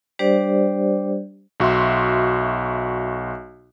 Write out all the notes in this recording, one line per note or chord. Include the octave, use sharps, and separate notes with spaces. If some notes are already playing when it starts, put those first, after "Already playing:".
G3 D4 G4 C5 D5
B1 F#4 E5 C6